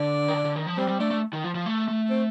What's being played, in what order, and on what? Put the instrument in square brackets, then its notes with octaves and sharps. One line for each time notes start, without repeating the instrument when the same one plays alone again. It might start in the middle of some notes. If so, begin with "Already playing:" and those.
Already playing: [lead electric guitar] D3 [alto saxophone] D4
[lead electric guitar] D#3
D3
D3
D#3
F3
[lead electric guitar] G3 [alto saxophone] C4
[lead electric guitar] G3
[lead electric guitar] A3 [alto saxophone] D4
[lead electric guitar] A3
D#3
F3
F3
A3
A3
[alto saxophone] C4